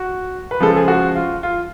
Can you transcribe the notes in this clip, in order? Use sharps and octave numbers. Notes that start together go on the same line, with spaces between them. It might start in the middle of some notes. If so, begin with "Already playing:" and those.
Already playing: F#4
B4
C#3 F3 G#3 A4
G#4
F#4
F4
F4